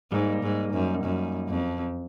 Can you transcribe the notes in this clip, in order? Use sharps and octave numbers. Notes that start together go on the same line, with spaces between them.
G#2 G3 A#3 D#4
G#2
F#2
F#2
F2